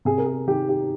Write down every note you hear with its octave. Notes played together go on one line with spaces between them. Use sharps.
C3 G#4
A#4
G#4
D#3 G4
G4